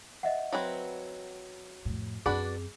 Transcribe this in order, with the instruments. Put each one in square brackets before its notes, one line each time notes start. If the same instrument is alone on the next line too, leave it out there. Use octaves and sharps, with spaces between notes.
[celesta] D#5 E5 F#5
[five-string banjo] F#3 C4 B4
[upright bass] F2 A2
[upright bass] F#2 C4 [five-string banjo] D4 F#4 B4 [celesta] G#4